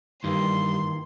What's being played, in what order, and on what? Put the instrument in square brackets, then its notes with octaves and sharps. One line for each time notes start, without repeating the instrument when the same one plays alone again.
[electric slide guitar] G2 [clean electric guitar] D#3 E3 A#3 [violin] C6